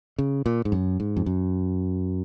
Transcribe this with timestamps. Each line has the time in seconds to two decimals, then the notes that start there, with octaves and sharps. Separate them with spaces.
0.19 C#3
0.46 A#2
0.65 G#2
0.72 F#2
1.00 G#2
1.16 F2
1.26 F#2